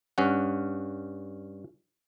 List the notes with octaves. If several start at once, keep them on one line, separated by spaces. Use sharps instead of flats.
G2 C#4 F#5